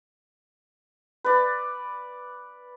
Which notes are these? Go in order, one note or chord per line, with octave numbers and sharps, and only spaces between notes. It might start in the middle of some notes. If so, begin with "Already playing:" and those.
B4 D5